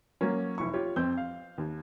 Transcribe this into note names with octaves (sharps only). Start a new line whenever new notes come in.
F#3 A#3 C#4
F1 E4 C#6
F4 G4 C#5
F2 C4 G6
F5
D#2